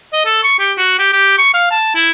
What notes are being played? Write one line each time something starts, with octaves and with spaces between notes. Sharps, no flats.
D#5
A4
C#6
G4
F#4
G4
G4
C#6
F5
A5
E4